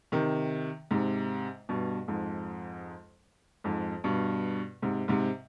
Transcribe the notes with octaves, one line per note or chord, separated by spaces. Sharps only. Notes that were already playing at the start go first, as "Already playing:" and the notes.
C3 D#3
G#2 C3
G2 B2
F2 G#2
F2 G#2
G2 B2
G#2 C3
G#2 C3